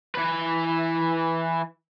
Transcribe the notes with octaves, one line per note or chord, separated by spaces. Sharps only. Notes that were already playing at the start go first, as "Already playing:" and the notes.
E3 B4